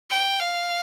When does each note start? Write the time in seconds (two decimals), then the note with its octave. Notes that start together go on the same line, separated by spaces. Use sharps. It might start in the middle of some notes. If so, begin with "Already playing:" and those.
0.10 G5
0.40 F5